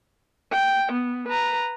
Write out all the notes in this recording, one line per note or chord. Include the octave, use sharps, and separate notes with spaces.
G5
B3
B4 A#5